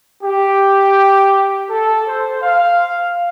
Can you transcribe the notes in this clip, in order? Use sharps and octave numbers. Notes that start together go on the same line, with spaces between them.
G4
A4
C5
F5